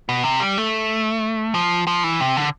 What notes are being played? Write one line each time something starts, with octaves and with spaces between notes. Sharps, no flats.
B2
C3
G3
A3
F3
F3
E3
C3
D3